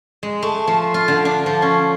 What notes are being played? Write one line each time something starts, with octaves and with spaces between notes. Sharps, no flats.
G#3
A3
F3
F4
D3
D4
F3
C#4